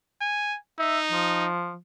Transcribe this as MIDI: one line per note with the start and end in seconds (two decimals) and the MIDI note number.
0.21 0.57 80
0.79 1.48 63
0.79 0.99 76
1.11 1.77 53